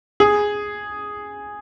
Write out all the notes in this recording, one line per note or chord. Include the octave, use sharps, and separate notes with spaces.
G#4